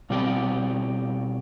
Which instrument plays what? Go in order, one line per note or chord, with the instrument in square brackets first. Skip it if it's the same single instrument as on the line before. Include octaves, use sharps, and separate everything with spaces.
[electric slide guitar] B2 G3 C4 G4